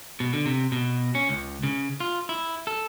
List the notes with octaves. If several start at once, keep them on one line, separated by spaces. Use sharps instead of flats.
B2
D3
C3
B2
C#4
C#2
C#3
F4
E4
A4